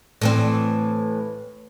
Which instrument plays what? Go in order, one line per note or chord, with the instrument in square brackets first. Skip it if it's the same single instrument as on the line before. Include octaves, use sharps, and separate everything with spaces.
[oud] A2 E3 C4